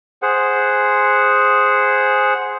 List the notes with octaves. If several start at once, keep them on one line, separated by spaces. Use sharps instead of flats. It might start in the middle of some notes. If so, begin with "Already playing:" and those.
G#4 C5 F#5